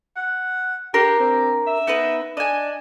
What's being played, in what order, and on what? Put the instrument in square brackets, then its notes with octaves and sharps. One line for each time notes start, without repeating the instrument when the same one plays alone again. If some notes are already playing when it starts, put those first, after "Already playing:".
[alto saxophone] F#5
[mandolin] D4 A#4 C6 [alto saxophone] G4
[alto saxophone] C4
E5
[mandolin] B3 D#4 B4
[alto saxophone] D4 [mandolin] D#5 G#5